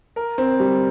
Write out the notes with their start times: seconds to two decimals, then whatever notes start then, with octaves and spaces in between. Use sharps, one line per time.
0.16 A#4
0.38 C4
0.60 G3